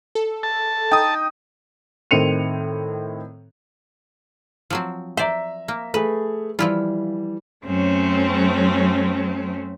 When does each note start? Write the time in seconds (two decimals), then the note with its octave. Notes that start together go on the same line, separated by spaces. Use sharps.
0.15 A4
0.43 A5
0.91 D#4 G5 D#6
2.11 A2 D#3 C4 C#7 D#7 F7
4.70 F3 F#3 C4
5.17 C5 D5 E5 A#5
5.68 A#3
5.94 A3 G#4 B4
6.59 E3 F3 G3 E4 F4
7.65 F#2 F#3 A3 C4 C#4